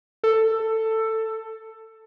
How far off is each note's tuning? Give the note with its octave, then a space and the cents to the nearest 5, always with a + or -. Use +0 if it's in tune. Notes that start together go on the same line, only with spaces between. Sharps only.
A4 +15